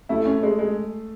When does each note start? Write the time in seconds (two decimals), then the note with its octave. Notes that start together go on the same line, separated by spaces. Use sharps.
0.09 A3 E4
0.25 C#4
0.43 G#3
0.59 G#3